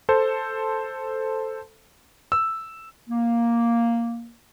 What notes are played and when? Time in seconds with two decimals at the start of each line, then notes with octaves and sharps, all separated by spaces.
0.09 A4 C5
2.32 E6
3.10 A#3